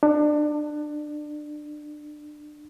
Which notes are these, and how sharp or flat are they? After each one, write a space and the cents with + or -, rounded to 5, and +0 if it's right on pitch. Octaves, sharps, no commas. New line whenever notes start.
D4 +25